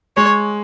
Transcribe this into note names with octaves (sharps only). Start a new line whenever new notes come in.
G#3 C#5